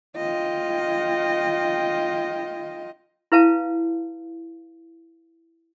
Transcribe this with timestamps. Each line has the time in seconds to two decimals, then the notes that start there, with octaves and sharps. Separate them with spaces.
0.17 F4 D#5 G5
3.32 E4 B4 F5 A5